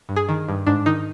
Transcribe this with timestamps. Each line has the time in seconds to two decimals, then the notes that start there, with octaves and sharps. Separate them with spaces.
0.09 G2
0.16 G#4
0.29 D#3
0.49 G2
0.67 G#2 D4
0.86 D#3 D#4